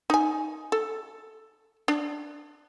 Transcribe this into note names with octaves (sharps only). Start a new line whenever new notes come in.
D#4 G#5
A4
D4